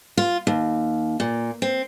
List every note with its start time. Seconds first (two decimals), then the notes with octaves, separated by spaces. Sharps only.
0.17 F4
0.47 D#2
1.20 A#2
1.62 C4